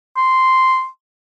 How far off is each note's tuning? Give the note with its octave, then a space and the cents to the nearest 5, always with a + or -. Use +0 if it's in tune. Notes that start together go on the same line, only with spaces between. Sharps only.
C6 -5